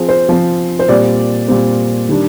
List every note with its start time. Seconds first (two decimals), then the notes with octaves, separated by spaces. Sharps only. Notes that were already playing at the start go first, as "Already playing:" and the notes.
Already playing: F3 C4 G#4
0.09 C5
0.29 F3 C4
0.79 C5
0.88 A#2 G3 C4 D5
1.48 A#2 G3 C4
2.09 D#3 G3 D4